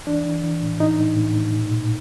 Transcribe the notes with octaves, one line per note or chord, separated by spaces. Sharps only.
E3 D4
E3
E3
A2
E3 D#4
A2
A2
A2
A#2
A#2